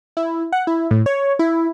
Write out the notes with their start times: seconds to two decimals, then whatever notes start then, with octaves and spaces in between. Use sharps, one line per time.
0.17 E4
0.52 F#5
0.67 E4
0.91 A2
1.06 C#5
1.39 E4